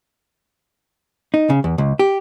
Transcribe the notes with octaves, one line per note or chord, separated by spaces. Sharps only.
D#4
C#3
E2
C#2
G4